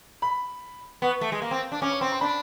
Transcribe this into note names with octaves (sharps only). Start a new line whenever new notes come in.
B5
B3 C#6
A3
G#3
A#3
C4
D4
C#4 D6
C#6
C4 C6
C6
D4 B5